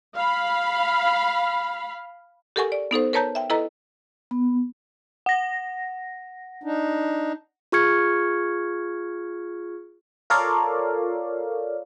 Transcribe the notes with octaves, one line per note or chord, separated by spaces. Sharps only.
F5 B5
G4 A4 A#4 F#5 G#5 C#6
D5
B3 D#4 A4 C5
A#4 B4 C#5 A5 A#5 G6
E5 G5
E4 A4 B4 D#5 A#5
B3
F#5 A#6
D4 D#4
F4 G#4 C#6 F6 G#6 C#7
F4 A4 A#4 C#5 D5 F5